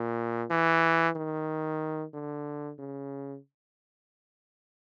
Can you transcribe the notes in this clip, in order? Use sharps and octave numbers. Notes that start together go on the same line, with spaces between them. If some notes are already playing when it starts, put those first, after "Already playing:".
Already playing: A#2
E3
D#3
D3
C#3